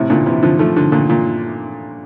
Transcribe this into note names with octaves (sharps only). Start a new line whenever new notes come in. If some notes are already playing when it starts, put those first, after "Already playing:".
Already playing: A2 C3
A#2 D3
C3 E3
D3 F3
F3 A3
D3 F3
A#2 D3
A#2